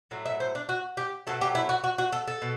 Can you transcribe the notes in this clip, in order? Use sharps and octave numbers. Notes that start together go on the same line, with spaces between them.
A2 F#3 A3
E5
C5
D4
F#4
G4
B2 F#3 A3 A4
G4
E4
F#4
F#4
F#4
A4
A4
B2